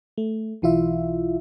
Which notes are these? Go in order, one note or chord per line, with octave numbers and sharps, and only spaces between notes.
A3
B1 E3 E4 F4 E5